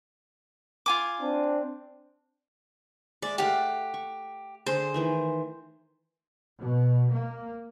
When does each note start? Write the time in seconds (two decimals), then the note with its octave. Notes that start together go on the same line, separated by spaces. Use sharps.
0.86 F4 G#5 D6
1.21 C4 D4
3.22 G#3 D5 E5
3.38 A3 G4 F5 F#5 D6
3.94 C#6
4.66 D3 G#4 A4 C5
4.94 D#3 E3 A3
6.59 B2
7.13 A#3